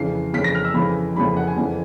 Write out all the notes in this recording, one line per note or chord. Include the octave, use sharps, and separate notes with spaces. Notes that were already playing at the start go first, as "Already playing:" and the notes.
Already playing: F2 C#3 E3 C7
F2 C#3 E3 B6
A#6
F6
E6
F2 C#3 E3 B5
F2 C#3 E3 B5
F#5
G#5
F2 C#3 E3